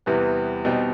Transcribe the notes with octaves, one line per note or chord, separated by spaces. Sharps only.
E2 C3 E3 G3 B3
B2 G3 C4 D#4